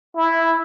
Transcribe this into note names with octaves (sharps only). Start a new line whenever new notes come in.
E4